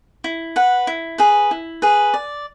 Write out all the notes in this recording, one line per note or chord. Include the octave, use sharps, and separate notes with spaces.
E4
B4 F#5
E4
G#4 B4
E4
G#4 B4
D5